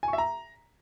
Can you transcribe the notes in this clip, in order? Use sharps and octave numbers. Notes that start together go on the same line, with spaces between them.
G#5
C#6
E5
A#5